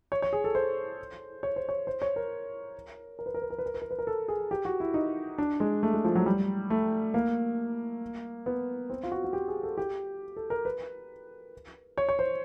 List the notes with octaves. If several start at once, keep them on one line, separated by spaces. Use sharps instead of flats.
C#5
C#5
G#4
A4
C5
C#5
C5
C#5
C5
C#5
A#4
A#4
B4
A#4
B4
A#4
B4
A#4
B4
A#4
B4
A#4
A4
G#4
G4
F#4
E4
D#4
D4
G#3
A3
G#3
F3
F#3
G3
A3
A#3
B3
C4
F4
F#4
F#4
G4
G#4
A4
G4
A4
A#4
B4
C#5
C#5
C5